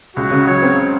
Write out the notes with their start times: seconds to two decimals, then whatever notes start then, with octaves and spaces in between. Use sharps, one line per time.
0.16 C#2 F#4
0.31 C#3
0.47 F#3 C#5
0.62 C4